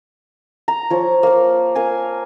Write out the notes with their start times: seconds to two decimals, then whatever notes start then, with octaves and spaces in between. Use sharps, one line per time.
0.68 A#5
0.90 F3 C#5
1.23 A#3 A#4
1.75 A#4 F5 G#5 A#5